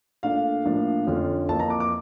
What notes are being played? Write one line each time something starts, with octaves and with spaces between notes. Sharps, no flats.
A#2 A3 D4 F5
A2 F3 A#3 D4
F2 D3 F3 C#4
F2 E3 A#3 A5
A#5
D6
D6